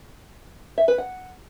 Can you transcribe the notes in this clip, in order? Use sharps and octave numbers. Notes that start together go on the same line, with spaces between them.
E5
B4
F#5